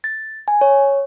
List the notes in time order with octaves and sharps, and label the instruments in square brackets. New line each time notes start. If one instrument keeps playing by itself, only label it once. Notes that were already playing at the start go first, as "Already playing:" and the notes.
[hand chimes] A6
G#5
C#5